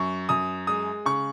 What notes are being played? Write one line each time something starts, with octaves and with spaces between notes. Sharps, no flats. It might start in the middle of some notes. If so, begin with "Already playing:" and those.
Already playing: F#2 C#6
F#2 D#6
G#3 D#6
C#3 C#6